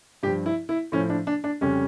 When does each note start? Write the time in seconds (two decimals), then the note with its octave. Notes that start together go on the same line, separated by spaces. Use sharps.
0.23 G2 G4
0.27 F3
0.46 E4
0.69 E4
0.92 A2 F3 C#4
1.10 D4
1.27 D4
1.44 D4
1.61 F2 C#3 G3 C#4